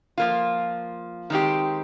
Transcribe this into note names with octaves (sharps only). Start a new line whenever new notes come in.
F3 A#3 F4
D#3 G#3 C4 G4